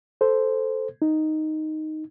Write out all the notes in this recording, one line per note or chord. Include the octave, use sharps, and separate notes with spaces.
A4 C5
D#4